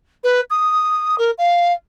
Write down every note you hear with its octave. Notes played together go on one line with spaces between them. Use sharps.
B4
D#6
A#4
F5